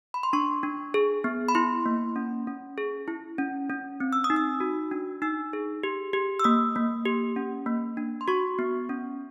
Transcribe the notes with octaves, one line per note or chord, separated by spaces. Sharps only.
B5
C6
D4 C#6
D4
G#4
B3
B5
E4 C6
A#3
C#4
C#4
G#4
E4
C#4
C#4
C4
E6
D#6
D#4
E6
F#4
D4
D#4 E6
G#4
G4
G4
E6
A#3 D#6
A#3
G4
C#4
A#3
D4
C6
F#4 C#6
B3
C#4